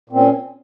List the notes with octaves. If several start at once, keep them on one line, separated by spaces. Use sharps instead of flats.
A#2 C4 C#4